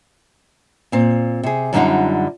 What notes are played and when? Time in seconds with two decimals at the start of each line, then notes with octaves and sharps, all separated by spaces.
0.92 A#2 C4
1.43 C3 G#4
1.73 F#2 D3 G3 D#4 F4 F#5